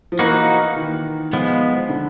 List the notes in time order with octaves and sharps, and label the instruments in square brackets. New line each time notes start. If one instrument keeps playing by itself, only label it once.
[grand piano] F3
[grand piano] E3 [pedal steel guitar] A#3 D#4 F#4 B4
[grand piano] D#3
[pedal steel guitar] F3 G#3 B3
[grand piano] D3